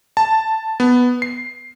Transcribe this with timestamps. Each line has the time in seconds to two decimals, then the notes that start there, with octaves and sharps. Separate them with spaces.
0.17 A5
0.80 B3
1.22 C7